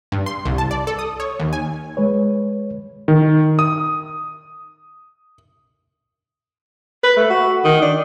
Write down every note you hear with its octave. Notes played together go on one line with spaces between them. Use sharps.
G2
C6
C2
A5
D5
A4
D#6
C#5
D#2
G#5
G#3 B4 C#5
D#3
D#6
B4
A3
F#4
D#3
D4